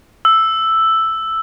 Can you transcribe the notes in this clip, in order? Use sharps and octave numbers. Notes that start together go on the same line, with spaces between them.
E6